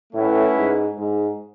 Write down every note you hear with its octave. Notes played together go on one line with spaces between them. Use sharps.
A2 A3 C#4 E4 B4 F#5
G#2
G#2